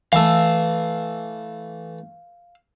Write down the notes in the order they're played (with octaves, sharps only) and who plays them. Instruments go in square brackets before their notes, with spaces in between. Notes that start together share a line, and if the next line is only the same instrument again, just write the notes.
[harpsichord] E3 A3 [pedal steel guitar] F5 E6